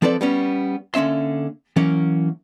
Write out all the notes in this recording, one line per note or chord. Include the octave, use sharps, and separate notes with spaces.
F3 C4 A4 B4 D5
G3 B3 C#4
D3 A#3 C#4 E5 C6
E3 F#3 A#3 C#4